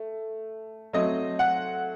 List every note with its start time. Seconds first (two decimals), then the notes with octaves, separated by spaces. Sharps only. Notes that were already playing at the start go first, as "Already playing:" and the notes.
Already playing: A3
0.93 F#3 A3 C4 D#5
1.39 F#5